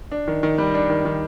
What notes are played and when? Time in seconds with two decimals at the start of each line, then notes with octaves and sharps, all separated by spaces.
0.12 D4
0.28 D#3
0.43 D#3
0.58 G3
0.75 D4
0.90 D#3
1.05 D#3